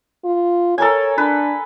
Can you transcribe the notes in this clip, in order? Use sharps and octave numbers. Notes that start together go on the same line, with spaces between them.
F4
A4 A#4 C#5 G#5
D4 B4